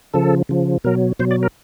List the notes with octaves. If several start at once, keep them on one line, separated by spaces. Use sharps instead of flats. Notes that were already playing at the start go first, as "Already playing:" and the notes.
C#3 F3 A4
C#3 F3
B2 F#3 A#4
B2 F#3 C5
D5
A#4